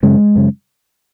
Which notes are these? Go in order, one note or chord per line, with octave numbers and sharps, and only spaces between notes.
F#2 C#3 G#3
F#2 C#3